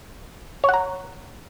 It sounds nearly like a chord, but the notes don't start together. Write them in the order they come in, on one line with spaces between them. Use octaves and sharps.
C#5 F#5 A#5